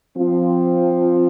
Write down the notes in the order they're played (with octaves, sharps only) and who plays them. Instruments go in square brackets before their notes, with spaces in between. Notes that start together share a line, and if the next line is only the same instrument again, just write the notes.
[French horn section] F3 C4 F4